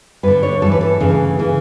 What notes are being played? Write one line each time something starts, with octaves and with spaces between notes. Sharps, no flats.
G2 D3 B4
C#5
G2 E3 A4
B4
A4
D2 C#3 E3
C#3 E3